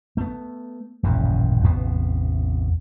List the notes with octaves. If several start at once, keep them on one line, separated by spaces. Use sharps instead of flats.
A3 B3
D#1 A1 F#2 C#3
A1 E2 C3 B3